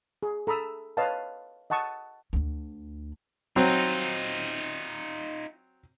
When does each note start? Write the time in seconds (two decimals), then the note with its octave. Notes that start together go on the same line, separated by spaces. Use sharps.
0.23 G#4
0.47 A4 A#5 B5 D#6 E6
0.97 B4 C#5 D#5 F5 A5
1.70 D#5 F#5 A5 C#6 D#6
2.33 D2 D4
3.56 F#3 C4 D#4 F4